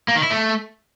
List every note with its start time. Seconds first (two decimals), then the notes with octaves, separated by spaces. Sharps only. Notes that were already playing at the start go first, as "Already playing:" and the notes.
0.08 A#3
0.16 D#3
0.23 E4
0.30 A3